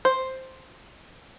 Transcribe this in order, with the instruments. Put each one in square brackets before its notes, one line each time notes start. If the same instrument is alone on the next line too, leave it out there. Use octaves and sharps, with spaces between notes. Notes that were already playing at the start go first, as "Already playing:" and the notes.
[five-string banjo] C5